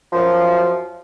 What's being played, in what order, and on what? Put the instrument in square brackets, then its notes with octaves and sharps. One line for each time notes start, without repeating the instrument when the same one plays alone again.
[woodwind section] F#2 F3